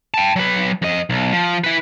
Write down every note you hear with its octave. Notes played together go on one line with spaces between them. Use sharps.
G5 A5
F#3 B4
F2 D#5
B1
F3
E4 B4